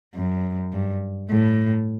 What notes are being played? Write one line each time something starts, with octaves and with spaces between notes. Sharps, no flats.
F#2
G2
A2